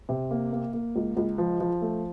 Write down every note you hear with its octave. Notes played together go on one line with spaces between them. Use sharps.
C3
A#3
A#3
A#3
C#2
C#2
F3
F3
A3